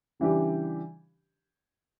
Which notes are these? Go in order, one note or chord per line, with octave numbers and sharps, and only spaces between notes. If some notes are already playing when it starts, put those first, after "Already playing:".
C#3 E3 G3 D4 G4